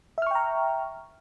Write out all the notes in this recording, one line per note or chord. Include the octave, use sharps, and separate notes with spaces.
E5 G5 A#5 C#6 F6